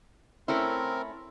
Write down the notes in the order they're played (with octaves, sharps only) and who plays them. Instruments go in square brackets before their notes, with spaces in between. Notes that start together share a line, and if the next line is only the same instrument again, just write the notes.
[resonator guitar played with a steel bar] A3 C#4 E4 [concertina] C4 A#4